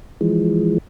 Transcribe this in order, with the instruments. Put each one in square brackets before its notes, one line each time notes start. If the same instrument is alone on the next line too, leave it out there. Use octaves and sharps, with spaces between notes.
[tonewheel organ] E3 F3 G#3